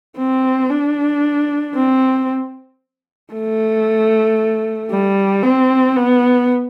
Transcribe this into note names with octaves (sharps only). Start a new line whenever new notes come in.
C4
D4
C4
A3
G3
C4
B3